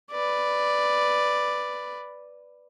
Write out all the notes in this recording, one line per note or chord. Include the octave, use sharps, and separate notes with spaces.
B4 D5